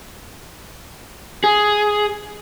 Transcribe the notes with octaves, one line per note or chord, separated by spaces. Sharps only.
G#4